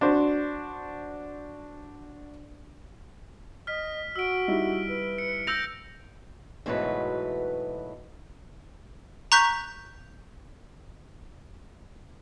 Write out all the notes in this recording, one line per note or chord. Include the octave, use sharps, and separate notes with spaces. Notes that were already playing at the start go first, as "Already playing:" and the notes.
D4 F#4 C5
D#5 F6 B6
F#4 E6 D7
G3 D#4 E4
B4
C#7
E6 G6 A#6 F7
G#2 B2 E3 F#3 A3 B4
A#5 C#6 F#6 G6 B6